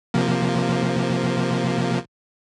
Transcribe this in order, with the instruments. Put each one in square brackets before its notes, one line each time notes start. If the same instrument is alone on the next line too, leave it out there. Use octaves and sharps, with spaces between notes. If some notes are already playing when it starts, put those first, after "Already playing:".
[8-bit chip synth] C3 F3 A#3